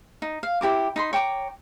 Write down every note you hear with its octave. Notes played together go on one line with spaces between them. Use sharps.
D#4
F5
E4 G4 A#4 D6
D#4 B5 C6
C#5 G5 A#5 D6